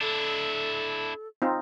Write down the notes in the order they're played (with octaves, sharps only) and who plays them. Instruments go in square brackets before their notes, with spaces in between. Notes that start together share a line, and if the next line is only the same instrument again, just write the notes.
[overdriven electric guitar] D4 E4 [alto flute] A4
[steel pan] C4 D#4 F4